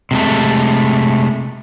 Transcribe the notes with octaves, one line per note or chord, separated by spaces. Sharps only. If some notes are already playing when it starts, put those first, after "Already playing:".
C3 G#3 A3